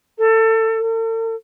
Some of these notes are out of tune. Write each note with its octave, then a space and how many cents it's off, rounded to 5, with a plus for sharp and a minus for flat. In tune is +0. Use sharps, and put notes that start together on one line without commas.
A4 +25
A4 +45